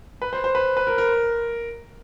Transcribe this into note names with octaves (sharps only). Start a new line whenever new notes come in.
B4
C5
C5
B4
B4
A#4
A#4